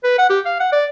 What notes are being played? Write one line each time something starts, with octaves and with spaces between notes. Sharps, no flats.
B4
F#5
G4
F5
F#5
D5